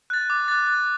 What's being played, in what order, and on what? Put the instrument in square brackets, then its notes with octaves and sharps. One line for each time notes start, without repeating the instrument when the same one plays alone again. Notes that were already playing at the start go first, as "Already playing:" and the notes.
[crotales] F#6 A6
D6
F#6 A6
F#6